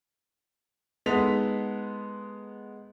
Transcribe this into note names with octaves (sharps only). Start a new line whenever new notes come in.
G#3 B3 D#4 A4 B6 F7